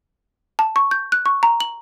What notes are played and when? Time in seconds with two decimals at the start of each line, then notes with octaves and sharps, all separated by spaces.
0.59 A5
0.76 C#6
0.91 G6
1.12 F#6
1.26 C#6
1.43 A#5
1.60 F#7